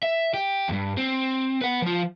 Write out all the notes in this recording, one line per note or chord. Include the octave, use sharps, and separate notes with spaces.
E5
G4
E2 G2
C4
B4 F#5
F3 F4